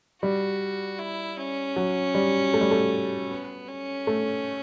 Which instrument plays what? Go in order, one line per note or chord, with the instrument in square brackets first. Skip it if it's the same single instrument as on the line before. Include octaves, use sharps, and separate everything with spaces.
[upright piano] G3 [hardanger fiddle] F#4
[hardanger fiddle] E4
C#4
[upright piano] F#3
G3
A3
G3
A3
[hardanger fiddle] B3
C#4
[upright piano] A3